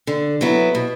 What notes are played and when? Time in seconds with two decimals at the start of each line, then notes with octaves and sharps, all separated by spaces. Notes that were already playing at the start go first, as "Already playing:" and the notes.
0.07 D3
0.41 F#3 B3 E4
0.75 B2